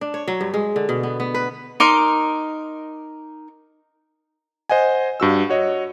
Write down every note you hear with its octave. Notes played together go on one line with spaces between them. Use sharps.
D4
C#5
F#3
G2
G#3
D3
B2
B3
B3
B4
D#4 A#4 C6 D6
C5 D#5 F#5 G#5
G2 F#4 E6
F#4 C#5 D#5